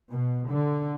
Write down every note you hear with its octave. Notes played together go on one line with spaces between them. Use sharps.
B2
D3